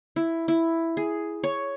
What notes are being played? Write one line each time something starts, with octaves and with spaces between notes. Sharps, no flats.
E4
E4
G#4
C#5